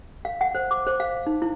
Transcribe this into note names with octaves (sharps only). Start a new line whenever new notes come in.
F5
F#5
C5
D6
C5
F5
D#4
E4